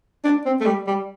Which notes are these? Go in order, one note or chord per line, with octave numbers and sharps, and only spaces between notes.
D4
C4
A3
G3
G3